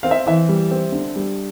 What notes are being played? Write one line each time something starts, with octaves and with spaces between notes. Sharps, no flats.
C4 F5
E5
E3 E5
G3
C4
D3
G3